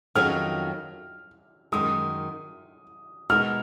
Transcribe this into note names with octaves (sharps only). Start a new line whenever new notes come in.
F2 D#3 F#3 C#4 G#4 F6
F#2 D#3 G#3 D#6
B2 G#3 B3 D#4 A#4 F6